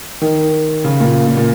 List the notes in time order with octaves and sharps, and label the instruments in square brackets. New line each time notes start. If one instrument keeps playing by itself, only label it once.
[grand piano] D#3
C#3
A#2
A#2
A#2